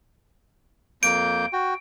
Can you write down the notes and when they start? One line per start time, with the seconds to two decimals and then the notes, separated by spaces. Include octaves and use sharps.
1.03 F2 A#3 G6 D7
1.53 F#4 G5